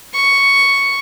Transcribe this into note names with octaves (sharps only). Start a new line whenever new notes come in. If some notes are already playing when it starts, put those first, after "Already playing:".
C#6